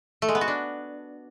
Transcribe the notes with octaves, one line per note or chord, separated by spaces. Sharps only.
A3
G#3
B3
F#4
D4